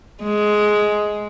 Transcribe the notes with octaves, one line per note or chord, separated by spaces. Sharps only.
G#3